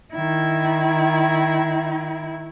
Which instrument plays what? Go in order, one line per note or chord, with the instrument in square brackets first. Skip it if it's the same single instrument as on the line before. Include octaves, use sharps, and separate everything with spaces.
[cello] D#3 E4